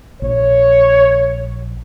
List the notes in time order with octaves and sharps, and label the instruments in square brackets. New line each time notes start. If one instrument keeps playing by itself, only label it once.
[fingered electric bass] A#1 [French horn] C#5